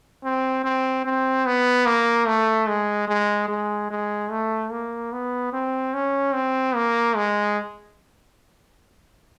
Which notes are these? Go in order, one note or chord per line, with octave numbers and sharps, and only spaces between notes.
C4
C4
C4
B3
A#3
A3
G#3
G#3
G#3
G#3
A3
A#3
B3
C4
C#4
C4
A#3
G#3